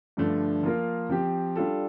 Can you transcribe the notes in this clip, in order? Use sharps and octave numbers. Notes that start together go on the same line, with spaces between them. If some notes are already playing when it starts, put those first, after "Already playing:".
G2 D3 F3 A3 D4
F3 A#3 F4 A#4
F3 C4 G4
G3 D4 F4 A4